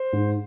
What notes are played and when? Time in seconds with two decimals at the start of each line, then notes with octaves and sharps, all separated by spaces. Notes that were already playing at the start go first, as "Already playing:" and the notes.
Already playing: C5
0.13 G#2